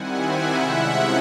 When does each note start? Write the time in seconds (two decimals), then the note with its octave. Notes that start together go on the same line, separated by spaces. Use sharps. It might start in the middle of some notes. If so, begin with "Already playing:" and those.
Already playing: D#3 G3 C4 E4 F#5 G#5
0.17 E5 F#5
0.55 C3 F3 G#3 C#4 E4